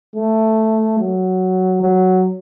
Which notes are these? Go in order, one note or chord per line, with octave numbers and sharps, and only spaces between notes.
A3
F#3
F#3